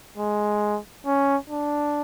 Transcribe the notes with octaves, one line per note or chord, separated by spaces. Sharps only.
G#3
C#4
D4